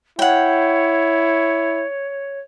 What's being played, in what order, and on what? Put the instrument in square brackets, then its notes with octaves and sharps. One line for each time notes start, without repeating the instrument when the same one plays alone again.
[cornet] E4 [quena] C#5 [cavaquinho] F#5 G5